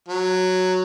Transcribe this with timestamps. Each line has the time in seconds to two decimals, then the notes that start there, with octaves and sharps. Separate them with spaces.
0.08 F#3